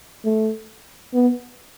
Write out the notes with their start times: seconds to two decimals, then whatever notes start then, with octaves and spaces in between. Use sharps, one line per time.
0.25 A3
1.14 B3